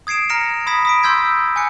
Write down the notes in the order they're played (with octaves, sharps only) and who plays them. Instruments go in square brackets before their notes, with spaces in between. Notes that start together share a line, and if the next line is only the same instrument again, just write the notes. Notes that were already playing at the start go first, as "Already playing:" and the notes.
[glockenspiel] D#6 G#6 C7 D7 E7
A#5 F6 A#6 C#7 E7
B5 D#6 G#6 B6
D#6 B6 D7
C6 E6 G6 G#6 B6 D7
G#5 D6 F#6 C#7